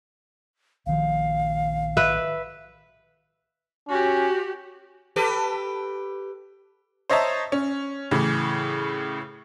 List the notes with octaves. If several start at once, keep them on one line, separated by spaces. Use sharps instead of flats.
A#1 D#3 F3 F5
B4 E5
C#4 F#4 G4
G4 A4 B4
C5 C#5 D#5 E5 A5 A#5
C#4
A2 C#3 E3